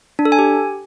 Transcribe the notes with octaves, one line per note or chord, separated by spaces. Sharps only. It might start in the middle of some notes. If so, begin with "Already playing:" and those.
D4
A4
G#5
G4